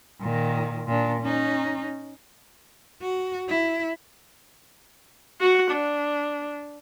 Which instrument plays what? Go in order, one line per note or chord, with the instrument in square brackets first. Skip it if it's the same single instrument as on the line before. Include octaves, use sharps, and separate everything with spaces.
[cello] A#2 D#3
A#2 D4
C#4 D#4
F#4
E4
[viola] F#4 F#5
D4